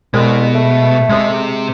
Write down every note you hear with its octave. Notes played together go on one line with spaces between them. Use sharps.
C2 B2 G#3
A3
C3 G#3 C4